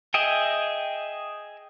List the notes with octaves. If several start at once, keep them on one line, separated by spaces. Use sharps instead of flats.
G#4 D#5 E5 G5